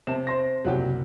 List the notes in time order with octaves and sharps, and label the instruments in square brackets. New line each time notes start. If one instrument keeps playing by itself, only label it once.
[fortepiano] C3 [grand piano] A5 E7
[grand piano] C5 C6 A#6
[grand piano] F#1 C2 [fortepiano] F#3 F#4 G4